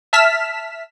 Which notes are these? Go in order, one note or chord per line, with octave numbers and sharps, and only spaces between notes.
E5 A5 F6 B6 E7